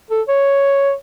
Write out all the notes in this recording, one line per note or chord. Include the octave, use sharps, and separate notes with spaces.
A4
C#5